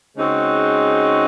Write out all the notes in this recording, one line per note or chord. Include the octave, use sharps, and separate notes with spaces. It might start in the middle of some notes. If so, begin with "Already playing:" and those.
C#3 G#3 C4 D#4 F#4